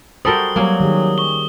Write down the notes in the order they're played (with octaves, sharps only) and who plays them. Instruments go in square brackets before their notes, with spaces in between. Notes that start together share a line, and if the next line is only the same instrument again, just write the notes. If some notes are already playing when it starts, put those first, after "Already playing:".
[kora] G3 A4 A#4 [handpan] F#4 C5 [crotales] D#6 G7
[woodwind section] F#3 [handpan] G3 C#5 [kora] A#3 C#4
[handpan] D#3 G4 G#4
[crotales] C#6 G7